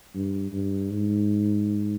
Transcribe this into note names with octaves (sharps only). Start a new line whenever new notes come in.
G2
G2
G#2